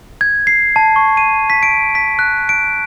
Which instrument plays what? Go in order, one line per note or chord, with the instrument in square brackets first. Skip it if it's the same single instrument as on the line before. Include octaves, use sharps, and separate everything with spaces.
[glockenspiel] G#6
C7
A5
C#6
D#7
B6
D7
B6
F#6
D7